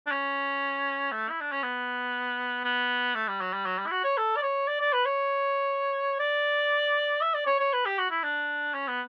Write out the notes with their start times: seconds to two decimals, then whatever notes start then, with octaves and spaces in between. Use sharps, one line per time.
0.07 D4
0.11 C#4
1.12 A3
1.30 E4
1.41 D4
1.52 C#4
1.63 B3
2.64 B3
3.15 A3
3.28 G3
3.41 F#3
3.53 G3
3.66 F#3
3.78 G3
3.87 E4
3.91 F#4
4.04 C#5
4.17 A4
4.36 D5
4.43 C#5
4.68 D5
4.81 D5
4.93 B4
5.05 C#5
6.20 D5
7.22 E5
7.34 D5
7.46 C#5
7.59 C#5
7.73 B4
7.85 G4
7.98 F#4
8.11 E4
8.23 D4
8.74 C#4
8.88 B3